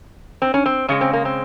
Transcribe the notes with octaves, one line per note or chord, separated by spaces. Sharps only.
C4
C#4
C4
C#3 G#3 C#4
C4
A#3
C4